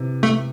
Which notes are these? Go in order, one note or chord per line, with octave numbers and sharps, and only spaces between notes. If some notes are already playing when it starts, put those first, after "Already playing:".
Already playing: C3 E3
A3